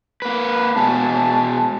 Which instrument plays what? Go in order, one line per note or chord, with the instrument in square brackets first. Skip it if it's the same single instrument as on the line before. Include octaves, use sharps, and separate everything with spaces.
[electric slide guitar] A#3 B4
[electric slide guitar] B2 G#3 [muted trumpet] A5